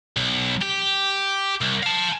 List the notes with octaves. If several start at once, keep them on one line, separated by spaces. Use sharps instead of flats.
B1
G4
C2
F5 A5